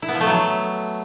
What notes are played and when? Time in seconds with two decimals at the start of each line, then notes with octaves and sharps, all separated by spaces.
0.02 E4
0.08 B3
0.15 F3
0.21 A3
0.27 F#3